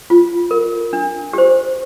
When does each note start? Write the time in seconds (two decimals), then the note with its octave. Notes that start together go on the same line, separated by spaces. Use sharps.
0.10 F4
0.51 A#4
0.93 D4
1.33 G4 C5